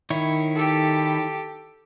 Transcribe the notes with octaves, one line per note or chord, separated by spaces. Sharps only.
D#3 E4 C#5
G4 A4